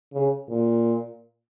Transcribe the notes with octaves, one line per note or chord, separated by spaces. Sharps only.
C#3
A#2